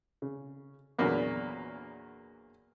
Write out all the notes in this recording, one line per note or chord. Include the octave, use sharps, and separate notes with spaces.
C#3
E2 A#2 D3 F#3 A#3 B3